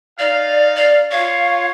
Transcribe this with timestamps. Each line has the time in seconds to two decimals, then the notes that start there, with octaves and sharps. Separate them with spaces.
0.19 D#4 D5 F5
0.76 D5
1.11 F4 C#5 F5